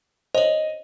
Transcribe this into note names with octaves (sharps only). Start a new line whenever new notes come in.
C5 C#5 D#5